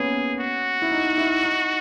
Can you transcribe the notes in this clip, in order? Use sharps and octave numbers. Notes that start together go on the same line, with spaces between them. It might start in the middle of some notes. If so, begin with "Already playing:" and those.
Already playing: A#3 B3 C#4 G#4
F#4
E4
D#4
E4
D#4